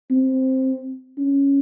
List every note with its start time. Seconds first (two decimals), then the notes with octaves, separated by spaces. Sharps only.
0.10 C4
1.18 C#4